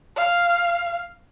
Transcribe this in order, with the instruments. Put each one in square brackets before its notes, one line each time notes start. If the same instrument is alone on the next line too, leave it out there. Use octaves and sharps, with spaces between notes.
[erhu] F5